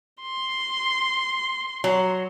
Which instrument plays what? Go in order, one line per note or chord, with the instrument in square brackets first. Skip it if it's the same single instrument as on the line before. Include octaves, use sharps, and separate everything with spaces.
[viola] C6
[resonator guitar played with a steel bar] F#3